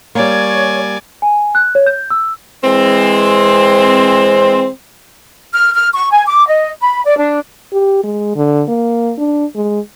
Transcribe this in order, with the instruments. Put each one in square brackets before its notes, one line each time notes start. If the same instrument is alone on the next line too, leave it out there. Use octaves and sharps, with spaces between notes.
[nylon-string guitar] G3 A#3 [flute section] C#5 [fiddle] D5 G#5
[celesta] G#5
F#6
C#5
G6
E6
[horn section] E3 G#3 C4
[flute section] F6
F6
C#6
G#5
D6
D#5
B5
D5
D4
[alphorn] G4
G#3
D3
A#3
D4
G#3